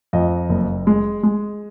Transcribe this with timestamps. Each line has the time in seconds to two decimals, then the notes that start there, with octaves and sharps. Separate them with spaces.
0.13 F2 D#5
0.49 F#1
0.87 G#3
1.23 G#3